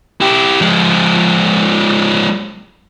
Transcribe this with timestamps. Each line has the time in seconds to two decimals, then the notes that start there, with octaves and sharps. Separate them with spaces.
0.21 E4 G4
0.61 F3 G#3